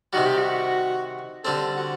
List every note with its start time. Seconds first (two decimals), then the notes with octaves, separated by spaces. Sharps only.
0.13 C3 D#3 G3 F#4
0.26 G4
0.38 F#4
1.44 D3 G3 C4 A4
1.77 F#4